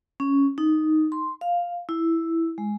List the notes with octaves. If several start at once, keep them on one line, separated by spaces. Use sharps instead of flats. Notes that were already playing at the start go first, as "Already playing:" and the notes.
C#4
D#4
C6
F5
E4
G#3